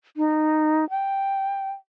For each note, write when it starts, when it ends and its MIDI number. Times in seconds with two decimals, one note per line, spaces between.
0.17 0.88 63
0.90 1.71 79